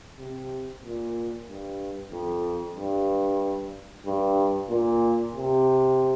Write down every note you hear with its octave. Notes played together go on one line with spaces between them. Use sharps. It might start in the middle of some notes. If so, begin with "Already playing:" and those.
C3
A#2
G2
F2
G2
G2
A#2
C3